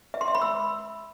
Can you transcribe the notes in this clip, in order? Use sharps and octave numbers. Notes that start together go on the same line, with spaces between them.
E5
C6
E5
B5
E6